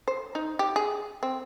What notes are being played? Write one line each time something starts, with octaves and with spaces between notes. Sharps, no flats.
C5
D#4
G4
G#4
C4